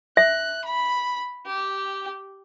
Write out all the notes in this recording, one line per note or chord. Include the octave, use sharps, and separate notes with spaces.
E5 F#6
B5
G4